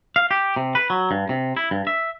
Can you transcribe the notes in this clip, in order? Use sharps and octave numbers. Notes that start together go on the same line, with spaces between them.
F5
G4
C3
B4
F#3
G2
C3
E4
G2
E5